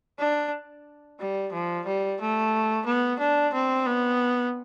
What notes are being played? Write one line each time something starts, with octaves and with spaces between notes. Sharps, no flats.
D4
G3
F3
G3
A3
B3
D4
C4
B3